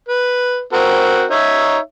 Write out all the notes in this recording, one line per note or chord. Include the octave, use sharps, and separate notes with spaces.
B4
C4 F#4 A#4
D#4 C#5 E5